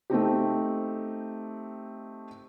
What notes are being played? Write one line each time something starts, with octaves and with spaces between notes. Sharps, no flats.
A3 C4 D#4 G4